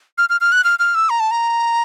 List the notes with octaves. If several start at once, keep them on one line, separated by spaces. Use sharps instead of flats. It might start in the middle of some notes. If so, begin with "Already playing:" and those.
F6
F6
F6
F#6
F6
F6
E6
A#5
A5
A#5